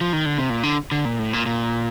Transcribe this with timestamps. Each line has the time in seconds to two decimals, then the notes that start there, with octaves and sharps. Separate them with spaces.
0.01 F3
0.13 D#3
0.26 D3
0.38 C3
0.50 A#2
0.63 D3
0.92 D3
1.05 A#2
1.19 A2
1.33 A#2
1.46 A#2